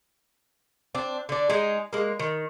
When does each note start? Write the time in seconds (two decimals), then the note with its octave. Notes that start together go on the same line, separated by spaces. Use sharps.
0.95 C4 D4
1.29 D3 D4
1.50 G#3 D#4 G#4
1.93 G#3 A#3
2.19 D#3